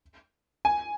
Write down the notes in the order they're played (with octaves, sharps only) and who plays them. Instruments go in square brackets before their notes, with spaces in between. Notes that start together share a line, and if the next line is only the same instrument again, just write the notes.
[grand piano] G#5